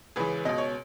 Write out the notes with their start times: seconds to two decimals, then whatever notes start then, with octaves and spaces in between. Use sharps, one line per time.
0.16 C#2 C#3 E3 G#4 B4
0.45 C#2 B2 D#5
0.58 C#5